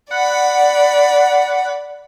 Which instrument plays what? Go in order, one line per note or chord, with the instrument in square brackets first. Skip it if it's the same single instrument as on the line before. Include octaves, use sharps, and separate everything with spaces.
[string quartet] D5 B5 [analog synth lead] F#5